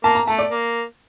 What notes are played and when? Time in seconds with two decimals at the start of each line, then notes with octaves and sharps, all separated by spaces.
0.04 A#3 A5
0.15 A#5
0.27 A3 A5
0.39 D5
0.50 A#3